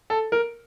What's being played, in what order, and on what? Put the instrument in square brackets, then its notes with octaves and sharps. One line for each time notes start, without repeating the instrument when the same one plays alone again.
[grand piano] A4
A#4